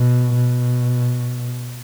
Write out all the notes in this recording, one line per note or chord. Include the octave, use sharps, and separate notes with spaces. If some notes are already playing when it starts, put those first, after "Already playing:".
Already playing: B2
B2